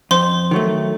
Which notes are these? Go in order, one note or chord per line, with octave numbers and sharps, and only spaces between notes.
F2 C5 C6
D#3 F#3 A3